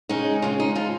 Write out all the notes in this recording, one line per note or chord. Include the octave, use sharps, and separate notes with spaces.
C#3 G#3 C#4 D#4 G#4
C#3 G#3 C#4 F4
D#4
F3 G#3 F4